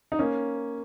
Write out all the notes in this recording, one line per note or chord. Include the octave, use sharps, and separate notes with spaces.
D#4
A#3 C#4